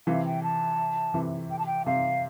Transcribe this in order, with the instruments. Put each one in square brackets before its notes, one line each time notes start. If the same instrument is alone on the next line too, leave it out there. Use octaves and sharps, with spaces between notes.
[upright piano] C3 E3 [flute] F5
[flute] G5
A5
[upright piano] C3 E3
[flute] G5
A5
G5
[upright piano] C3 [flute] F5